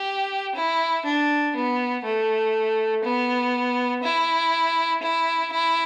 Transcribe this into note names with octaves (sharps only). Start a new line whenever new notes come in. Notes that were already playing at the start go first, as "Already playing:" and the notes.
Already playing: G4
E4
D4
B3
A3
B3
E4
E4
E4